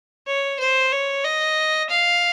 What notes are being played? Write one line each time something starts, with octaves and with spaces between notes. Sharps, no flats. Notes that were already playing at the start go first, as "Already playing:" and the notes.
C#5
C5
C#5
D#5
F5